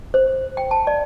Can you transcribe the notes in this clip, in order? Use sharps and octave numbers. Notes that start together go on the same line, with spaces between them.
C5
G5
A5
D5